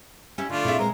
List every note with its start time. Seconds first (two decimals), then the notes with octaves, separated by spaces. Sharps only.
0.38 C#4 E4 G4
0.50 D3 A3 D4 F4
0.65 A#2 C4 E4 G#4 E5
0.79 G#3 A#4 C5